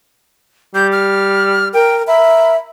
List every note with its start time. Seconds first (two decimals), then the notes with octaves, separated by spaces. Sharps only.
0.75 G3 G6
0.92 F6
1.74 A#4 G5
2.07 A#4 E5 B5